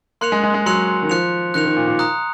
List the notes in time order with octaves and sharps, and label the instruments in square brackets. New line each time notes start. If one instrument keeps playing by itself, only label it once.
[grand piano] A#3 [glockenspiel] C6 F#6 C#7 F7
[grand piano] G#3
G#3
G#3
[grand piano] F#3 [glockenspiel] C6 F#6 C#7 F7
[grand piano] D#3
[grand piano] F3 [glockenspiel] F#6 C#7 F7
[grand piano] D#3 [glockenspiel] F#6 C#7 F7
[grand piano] D#3
A#2
A#2
[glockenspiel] A#5 D#6 F#6